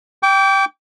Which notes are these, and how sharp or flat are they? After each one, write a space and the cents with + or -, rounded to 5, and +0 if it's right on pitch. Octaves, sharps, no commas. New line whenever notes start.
G5 +0 D6 -35